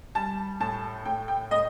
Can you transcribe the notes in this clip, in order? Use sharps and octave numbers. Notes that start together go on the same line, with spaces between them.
G3 A5
A2 A5
A2 G5
G5
A2 D#5